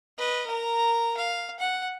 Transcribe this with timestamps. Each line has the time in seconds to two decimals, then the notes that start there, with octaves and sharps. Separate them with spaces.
0.18 B4 D#5
0.47 A#4 A#5
1.17 F5
1.59 F#5